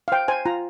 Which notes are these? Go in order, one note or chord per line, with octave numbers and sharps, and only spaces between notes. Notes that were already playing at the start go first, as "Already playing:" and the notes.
F5
C5 G5
C5 G#5
F4 A#5